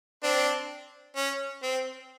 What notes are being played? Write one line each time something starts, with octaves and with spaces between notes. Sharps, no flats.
C4 D4
C#4
C4